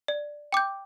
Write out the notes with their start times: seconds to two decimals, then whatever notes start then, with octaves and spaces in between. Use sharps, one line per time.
0.08 D5
0.52 G5 D6 G6